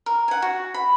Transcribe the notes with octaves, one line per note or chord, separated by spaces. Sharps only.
A#4
F#5 G#5
F#4
B5